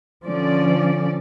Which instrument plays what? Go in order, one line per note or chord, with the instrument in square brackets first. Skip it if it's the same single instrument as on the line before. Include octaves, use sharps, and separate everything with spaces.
[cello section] D3 F3 C#4 D5